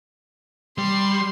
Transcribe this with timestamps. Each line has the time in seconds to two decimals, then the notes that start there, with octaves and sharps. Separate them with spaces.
0.78 G3 C6